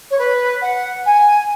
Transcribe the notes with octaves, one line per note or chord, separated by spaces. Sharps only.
C#5
B4
F#5
G#5